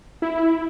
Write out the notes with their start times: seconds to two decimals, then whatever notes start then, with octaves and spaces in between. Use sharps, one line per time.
0.22 E4